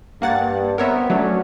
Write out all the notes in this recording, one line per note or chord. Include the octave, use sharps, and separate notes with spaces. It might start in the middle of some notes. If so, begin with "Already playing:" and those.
G2 A#3 F#5 A6
B3 C4 A#4 C#5 E5
F#3 A3 C#4 D4 F#4